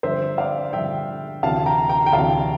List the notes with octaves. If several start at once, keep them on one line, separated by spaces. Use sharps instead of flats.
G2 D3 F3 C5 E5
D5 F5
G2 D3 F3 E5 G5
D2 C3 E3 F5 A5
G5 A#5
G5 A#5
G5
D2 C3 E3 F5 A5